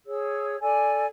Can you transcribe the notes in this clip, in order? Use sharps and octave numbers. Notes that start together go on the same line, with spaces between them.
G#4 C#5 E6
A4 D5 G#5